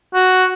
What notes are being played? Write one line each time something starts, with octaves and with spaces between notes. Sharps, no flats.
F#4